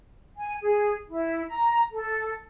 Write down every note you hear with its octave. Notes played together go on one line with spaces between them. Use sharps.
G#5
G#4
E4
A#5
A4